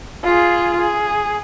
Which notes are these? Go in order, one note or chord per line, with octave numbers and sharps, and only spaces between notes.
F4 G#4
G#4